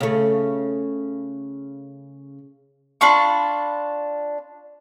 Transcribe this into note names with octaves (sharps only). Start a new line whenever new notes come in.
C#3 A3
D4 F4 B5 C#6